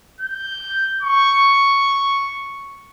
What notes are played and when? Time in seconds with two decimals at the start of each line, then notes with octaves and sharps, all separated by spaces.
0.21 G6
1.03 C#6